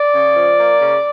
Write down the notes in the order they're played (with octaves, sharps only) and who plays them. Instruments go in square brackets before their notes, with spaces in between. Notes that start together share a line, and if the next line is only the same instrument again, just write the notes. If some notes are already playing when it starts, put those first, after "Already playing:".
Already playing: [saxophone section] D5
C#3
F3
A#3
C#3